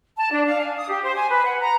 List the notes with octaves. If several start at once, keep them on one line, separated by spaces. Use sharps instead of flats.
A5
D4
F5
G#5
D#6
G4
C5
G#5
B4
F#5
A#5